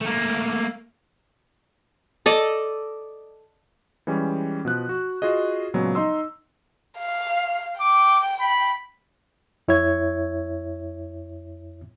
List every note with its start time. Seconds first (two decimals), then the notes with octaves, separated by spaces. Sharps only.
0.02 A3 A#3
2.26 A4 D5 D#5
4.07 E3 G3 G#3 C#4
4.65 B2 F3 F#6
4.89 F#4
5.22 F4 F#4 G#4 D#5
5.74 A#2 C#3 F3 F#3 G#3 B3
5.95 D#4 D#5 C6 E6
6.98 F5
7.81 G5 D6
8.40 B5
9.68 F2 E4 C#5 E5 G#6